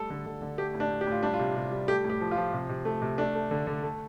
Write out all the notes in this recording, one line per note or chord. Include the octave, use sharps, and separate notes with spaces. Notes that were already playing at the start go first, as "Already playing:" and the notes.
Already playing: G3 A3 A4
D3
D3
D3
A3 G4
A2
D4
A2
G4
A2 F4
G3 D4
F4
C3
C3
G3
A3 G4
A2
G4
F3
F4
F3
C3
C3
A3
C3
A3 D4
A3
D3
D3
A3